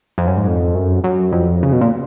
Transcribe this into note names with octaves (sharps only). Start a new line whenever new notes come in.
F2
F#2
G#2
F2
F#2
F#2
F2
C#3
B2
A#2